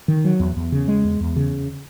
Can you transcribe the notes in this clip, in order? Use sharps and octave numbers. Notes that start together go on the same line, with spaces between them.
D#3
F#3
E2
E2
C#3
G#3
E2
E2
C#3